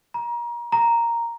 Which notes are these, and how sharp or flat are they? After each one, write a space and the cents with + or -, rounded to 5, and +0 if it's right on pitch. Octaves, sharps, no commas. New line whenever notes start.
A#5 +30
A#5 +0